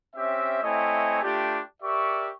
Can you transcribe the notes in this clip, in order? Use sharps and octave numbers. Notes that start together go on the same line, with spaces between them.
C4 C#4 G4 E5
A3 C4 E4 C#5 D#5 G#5
A3 D4 F4 G4
G4 A#4 D5 E5 C#6